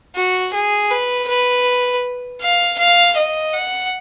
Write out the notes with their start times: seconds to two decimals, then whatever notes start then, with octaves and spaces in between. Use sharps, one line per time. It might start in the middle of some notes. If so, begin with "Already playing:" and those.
0.15 F#4
0.54 G#4
0.90 B4
1.28 B4
2.41 F5
2.78 F5
3.17 D#5
3.54 F#5